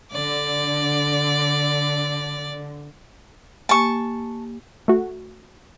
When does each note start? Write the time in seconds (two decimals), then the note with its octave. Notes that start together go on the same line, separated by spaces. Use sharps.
0.12 D3 D5
3.69 A#3 G4 G#5 A5 C#6
4.88 A3 F#4